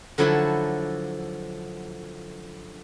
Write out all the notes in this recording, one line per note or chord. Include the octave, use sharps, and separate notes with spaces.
D3 F3 F#3 E4 A5 B5